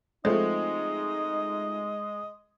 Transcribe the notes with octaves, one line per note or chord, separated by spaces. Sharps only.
F3 G#3 A3 C4 D#4 D#5